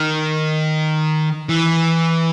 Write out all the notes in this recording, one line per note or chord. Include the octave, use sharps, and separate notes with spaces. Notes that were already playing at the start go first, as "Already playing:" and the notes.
Already playing: D#3
E3